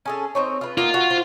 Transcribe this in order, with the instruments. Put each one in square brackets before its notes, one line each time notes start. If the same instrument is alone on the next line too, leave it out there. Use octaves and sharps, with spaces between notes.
[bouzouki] C#4 G#4 A4
C4 D#4 C#5
F4 B4
[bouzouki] A#3 D#4 F#5 [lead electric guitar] F4
[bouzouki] F#4
C5